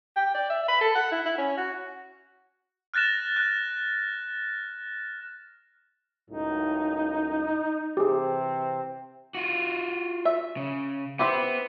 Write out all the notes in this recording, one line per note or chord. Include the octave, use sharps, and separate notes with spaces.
G5
D5
E5
B5
A4
F#5
E4
E4
C#4
F#4
F6 F#6 A6 A#6 E7
F#6
C#2 F#2 A2 D#4
C3 E3 C4 G4 G#4
F4 F#4
E5
C#3
B3 C4 E4 G4